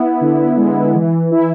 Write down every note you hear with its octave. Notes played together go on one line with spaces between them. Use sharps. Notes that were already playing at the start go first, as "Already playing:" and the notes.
Already playing: B3 E4
D3
G#3
E3
E4